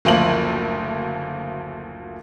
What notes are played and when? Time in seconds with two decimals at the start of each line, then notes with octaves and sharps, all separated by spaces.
0.05 F#1 D2 F3 A#3 F#7